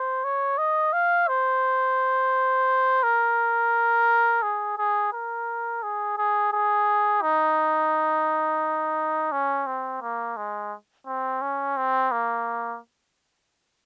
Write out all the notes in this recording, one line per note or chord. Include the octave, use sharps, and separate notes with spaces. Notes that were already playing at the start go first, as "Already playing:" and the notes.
Already playing: C5
C#5
D#5
F5
C5
A#4
G#4
G#4
A#4
G#4
G#4
G#4
D#4
C#4
C4
A#3
G#3
C4
C#4
C4
A#3